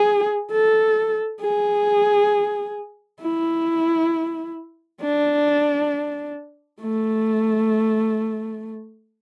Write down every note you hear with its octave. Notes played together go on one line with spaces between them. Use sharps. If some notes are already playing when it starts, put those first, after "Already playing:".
Already playing: G#4
A4
G#4
E4
D4
A3